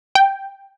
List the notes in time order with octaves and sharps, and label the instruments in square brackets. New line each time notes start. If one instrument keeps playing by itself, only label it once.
[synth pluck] G5